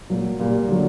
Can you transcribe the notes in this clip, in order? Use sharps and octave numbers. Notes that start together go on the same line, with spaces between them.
A#2 F#3
A#2 G3
D3 F#3